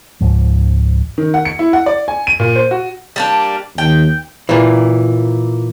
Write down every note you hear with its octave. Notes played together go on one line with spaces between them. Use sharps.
C#2 G#2 F3
D#3
F#5
C#7
E4
F#5
D5
G#5
D#7
A#2
C5
F#4
G3 A#3 D4
D#2 G5
A#2 E3